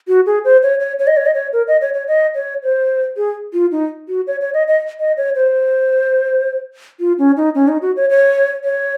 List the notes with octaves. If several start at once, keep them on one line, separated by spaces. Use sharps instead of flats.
F#4
G#4
C5
C#5
C#5
C#5
D#5
C#5
D#5
C#5
A#4
D#5
C#5
C#5
D#5
C#5
C5
G#4
F4
D#4
F#4
C#5
C#5
D#5
D#5
D#5
C#5
C5
F4
C#4
D#4
C#4
D#4
F#4
C#5
C#5
C#5